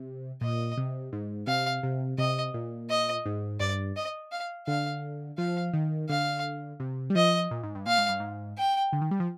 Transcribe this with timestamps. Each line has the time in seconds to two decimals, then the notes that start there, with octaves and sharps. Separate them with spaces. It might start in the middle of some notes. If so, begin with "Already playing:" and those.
Already playing: C3
0.41 A#2 D#5
0.77 C3
1.13 G#2
1.47 C3 F5
1.83 C3
2.18 C3 D#5
2.54 A#2
2.90 D#5
3.26 G#2
3.60 G2 D5
3.96 D#5
4.32 F5
4.67 D3 F5
5.38 F3 F5
5.73 D#3
6.09 D3 F5
6.80 C3
7.10 G3
7.15 F3 D#5
7.51 A#2
7.63 G#2
7.75 G2
7.86 A#2 F5
7.98 G#2
8.09 G2
8.20 G#2
8.58 G5
8.93 D3
9.01 D#3
9.11 G3
9.20 F3